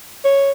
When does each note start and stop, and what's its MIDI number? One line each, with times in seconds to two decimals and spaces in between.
0.25 0.51 73